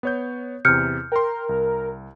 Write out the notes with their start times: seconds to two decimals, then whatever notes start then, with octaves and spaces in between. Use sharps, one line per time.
0.03 B3 C#5 G6
0.65 E2 C3 F6 G6 C#7
1.12 A#4 G5 C6
1.49 C2